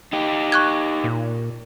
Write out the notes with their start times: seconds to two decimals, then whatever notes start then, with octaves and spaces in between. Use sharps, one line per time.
0.13 D#4 G4
0.52 C#6 F#6 G#6
1.04 A#2